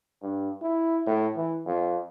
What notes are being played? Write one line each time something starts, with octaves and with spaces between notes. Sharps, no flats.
G2
E4
A2
E3
F2